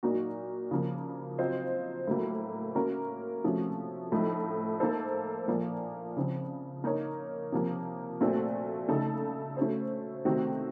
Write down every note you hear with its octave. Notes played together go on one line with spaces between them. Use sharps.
A#2 F#3 A#3 D#4 F#4
C#3 F3 A#3
F#3 C4 F4 C5 D#5
A2 F#3 A#3
A#3 C#4 F#4 A#4
C3 F3 A3 C#4 F#4
A2 F3 A3 D#4
A#3 D#4 A4 C5
A#2 F3 A#3
C#3 F3 C4
A#3 D#4 A#4 C#5
C3 F3 A#3
A#2 A3 C4 F#4 A4
C#3 A3 D#4 A4
A3 C#4 F#4 C5
C3 D#3 A3 C4 F#4